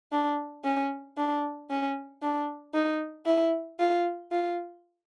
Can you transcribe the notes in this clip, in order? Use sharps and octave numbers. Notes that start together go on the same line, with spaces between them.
D4
C#4
D4
C#4
D4
D#4
E4
F4
F4